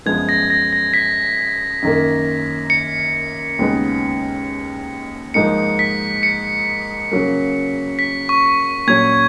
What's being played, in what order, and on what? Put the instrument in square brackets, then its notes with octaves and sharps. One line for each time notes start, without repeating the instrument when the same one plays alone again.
[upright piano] F#2 F3 G#3 B3 [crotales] G#6
[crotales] A#6
A#6
A#6
B6
[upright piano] F#2 D#3 A#3
[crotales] C#7
[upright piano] D#2 C#3 G#3 B3 D#4
[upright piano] G#2 F3 A#3 D#4 [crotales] C#7
[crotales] B6
C#7
[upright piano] C#3 F#3 A#3
[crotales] B6
C#6
[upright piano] A#2 F#3 C#4 [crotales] G#6